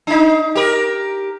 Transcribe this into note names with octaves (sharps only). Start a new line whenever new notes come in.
D4 D#4
G4 A#4